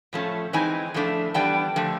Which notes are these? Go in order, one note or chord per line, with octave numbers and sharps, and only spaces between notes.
A2 F3 A3 C#4
E3 G#3 C4 D#4 G#5
A2 F3 A3 D4
E3 G3 B3 D4 G5
D3 F3 A3